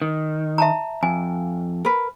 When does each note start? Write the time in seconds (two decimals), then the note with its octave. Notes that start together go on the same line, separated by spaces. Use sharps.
0.02 D#3
0.58 E5 A5 A#5
1.03 F2 G#5
1.85 A#4 B4